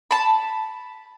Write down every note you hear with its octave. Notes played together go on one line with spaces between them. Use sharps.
A5 B5